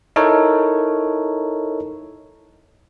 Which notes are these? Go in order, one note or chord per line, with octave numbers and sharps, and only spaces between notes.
D#4 E4 A4 A#4 C#5